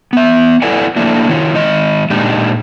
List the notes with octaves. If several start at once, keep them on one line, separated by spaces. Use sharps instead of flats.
B3 E5
E4 A4 B4 D5 F#5 G#5
F3 A3 A#3 D4 E4
D#3 E4 F4 C#5
D#3 G#3 D#5
A#2 G#3 D4 D#4 G4